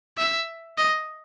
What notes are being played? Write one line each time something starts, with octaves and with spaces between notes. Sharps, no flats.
E5
D#5